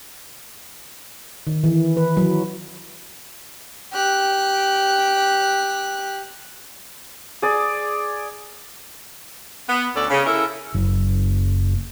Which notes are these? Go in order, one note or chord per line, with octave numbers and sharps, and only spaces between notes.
D#3
E3
B4
F#3
G4 F#6
G#4 D5
B3
D2 C#4 A4 D5
C#3
C#4 E4 A4 A#4
F#1